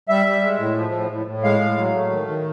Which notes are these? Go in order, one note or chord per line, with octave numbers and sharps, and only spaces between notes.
G3 E5
G3
G#3
A2
F3
A2
A2
A2
G#3 F5
A2
F#3
A3
D#3
D#3